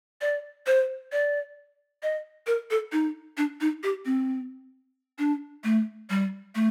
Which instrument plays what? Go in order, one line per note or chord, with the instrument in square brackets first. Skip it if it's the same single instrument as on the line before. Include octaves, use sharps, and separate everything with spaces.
[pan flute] D5
C5
D5
D#5
A#4
A4
D#4
D4
D#4
G4
C4
D4
A3
G3
A3